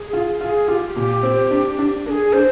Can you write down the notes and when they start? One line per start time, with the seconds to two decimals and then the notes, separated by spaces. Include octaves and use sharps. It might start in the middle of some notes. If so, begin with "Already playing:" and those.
Already playing: G#4
0.13 F4
0.41 F4 G#4
0.68 F4 G4
0.96 A#2 G4
1.23 C4
1.51 D4
1.79 D4
2.06 D4 A#4
2.09 G#4
2.33 D4 C5